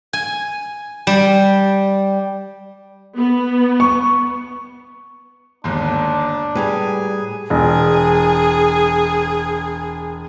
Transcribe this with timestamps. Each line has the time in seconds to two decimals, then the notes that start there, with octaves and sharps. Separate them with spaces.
0.13 G#5
1.07 G3
3.17 B3
3.80 C#6
5.64 G1 D#2 G#2 D4
6.55 A2 G3 G#4 B4 G#5 A#5
7.50 E1 G#4